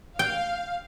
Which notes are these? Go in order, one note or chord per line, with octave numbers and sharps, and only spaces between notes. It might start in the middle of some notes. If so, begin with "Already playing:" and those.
F5 G5